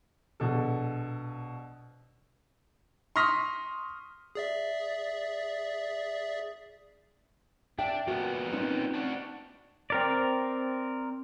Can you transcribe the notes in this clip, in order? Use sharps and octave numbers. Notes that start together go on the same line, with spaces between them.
A#1 B2 A4
C6 C#6 D#6 F6 A#6 B6
G#4 D5 E5
D4 E5 G5
A#2 B3 F#4 A#4
C4 C#4 D#4
D4 F#4
C4 A#4 D5